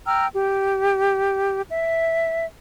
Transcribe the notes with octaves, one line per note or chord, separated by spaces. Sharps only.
G5 A#5 E6 F6
G4
E5